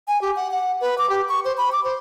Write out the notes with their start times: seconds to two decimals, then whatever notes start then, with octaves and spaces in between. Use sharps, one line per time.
0.08 G#5
0.21 G4
0.36 F#5
0.51 F#5
0.81 B4
0.98 D6
1.09 G4
1.29 C#6
1.45 C5
1.57 B5
1.72 D6
1.84 C5